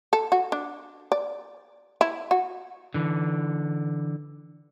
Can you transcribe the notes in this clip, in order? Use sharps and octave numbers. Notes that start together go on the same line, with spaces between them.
A4
F#4
D4
D5
E4
F#4
D3 E3